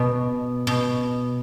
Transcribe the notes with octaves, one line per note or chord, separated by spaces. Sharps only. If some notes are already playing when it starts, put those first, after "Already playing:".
Already playing: B2
B2